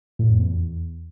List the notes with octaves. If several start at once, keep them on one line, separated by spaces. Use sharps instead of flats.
A2
F2
E2